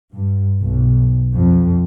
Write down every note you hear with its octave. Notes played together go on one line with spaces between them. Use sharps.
G2
B1
F2